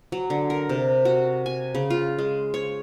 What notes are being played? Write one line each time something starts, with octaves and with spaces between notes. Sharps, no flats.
F#3
D3
A#4
C3
F#4
G#5
C#3
F4
G#3
C#5